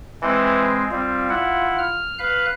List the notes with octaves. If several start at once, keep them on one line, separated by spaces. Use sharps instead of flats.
E3 G#3 C4
G3 C4 F4
E4 F#5
F6
B4 F5 F#6